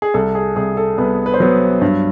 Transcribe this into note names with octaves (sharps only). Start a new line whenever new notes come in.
G#4
C2 A4
G#4
C2 G#4
A4
C2 B3 B4
B4
C5
F#3 B3 B4
G2